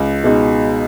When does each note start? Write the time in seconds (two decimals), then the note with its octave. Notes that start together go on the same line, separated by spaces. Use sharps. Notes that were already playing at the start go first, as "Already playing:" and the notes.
Already playing: C#2
0.24 B2 G#3 D#4